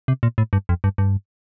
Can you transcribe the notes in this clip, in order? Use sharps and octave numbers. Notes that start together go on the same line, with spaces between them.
C3
A#2
A2
G2
F2
G2
G2